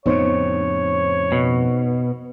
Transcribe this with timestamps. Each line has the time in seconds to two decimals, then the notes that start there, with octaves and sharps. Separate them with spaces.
0.06 F2 A2 C#3 B3 D#4 C5 C#5
1.32 B2